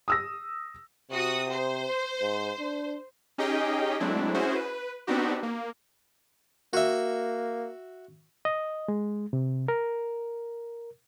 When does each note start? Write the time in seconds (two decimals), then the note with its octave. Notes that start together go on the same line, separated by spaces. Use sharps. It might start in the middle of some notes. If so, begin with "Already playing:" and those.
0.08 D#6 E6 A#6
1.11 C3 F#4 D#6
1.50 C5
2.21 G#2
2.59 D4
3.38 C#4 D#4 G4 G#4 D#5 G5
4.00 F#3 G#3 A3 C4 D4 E4
4.34 C#4 E4 F#4 G#4 C5
4.55 B4
5.07 B3 C4 D4 D#4 F#4 G4
5.43 A#3
6.73 A#3 F#4 E5
8.45 D#5
8.88 G#3
9.33 C3
9.68 A#4